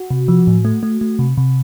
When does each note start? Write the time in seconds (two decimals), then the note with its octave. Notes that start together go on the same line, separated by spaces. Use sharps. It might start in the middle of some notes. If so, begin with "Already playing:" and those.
Already playing: F#4
0.10 C3
0.28 F3
0.47 A2
0.65 A3
0.83 A3
1.01 A3
1.19 C3
1.37 C3